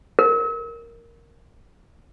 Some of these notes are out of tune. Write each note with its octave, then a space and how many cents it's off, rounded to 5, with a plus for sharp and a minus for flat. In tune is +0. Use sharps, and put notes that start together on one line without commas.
A#4 -5